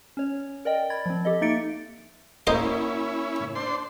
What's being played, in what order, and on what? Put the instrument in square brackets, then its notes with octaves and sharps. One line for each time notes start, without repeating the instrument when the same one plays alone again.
[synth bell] C#4 C#5
A#4 D5 D#5 G5
B5 G#6 A6
F3 C4
G4 A4 D#5
A#3 D#4 E5 A6 C#7 D7
[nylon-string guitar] A#3 F#4 A#4 [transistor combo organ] C#4 E4 [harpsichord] C5 D#5 C6
[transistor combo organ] D4 C5 C6